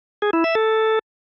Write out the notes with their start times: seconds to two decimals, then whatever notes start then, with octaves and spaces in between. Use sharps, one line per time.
0.22 G#4
0.33 E4
0.44 E5
0.55 A4